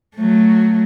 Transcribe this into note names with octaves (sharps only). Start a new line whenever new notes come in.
F#3 A3